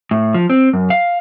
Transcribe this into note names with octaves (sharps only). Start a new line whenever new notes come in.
A2
F3
C4
F#2
F5